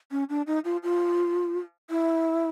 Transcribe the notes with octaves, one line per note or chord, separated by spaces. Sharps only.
C#4
D4
D#4
F4
F4
E4